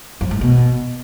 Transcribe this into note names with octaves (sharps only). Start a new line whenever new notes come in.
F2
G#2
B2